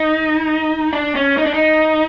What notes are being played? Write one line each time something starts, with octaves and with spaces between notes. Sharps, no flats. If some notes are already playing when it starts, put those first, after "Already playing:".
Already playing: D#4
D4
C#4
D#4
D4
D#4